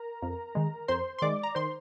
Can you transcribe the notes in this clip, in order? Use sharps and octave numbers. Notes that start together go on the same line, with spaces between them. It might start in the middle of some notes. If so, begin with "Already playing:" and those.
Already playing: A#4 A#5
F2
D#3 G#3
F2 C5 C6
C6
D#3 G#3 D5 D6
A#5
D#3 C5 C6